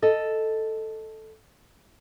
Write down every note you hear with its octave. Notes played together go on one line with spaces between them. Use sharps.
A4 D#5